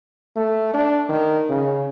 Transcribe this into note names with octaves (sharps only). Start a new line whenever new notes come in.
A3
D4
D#3
C#3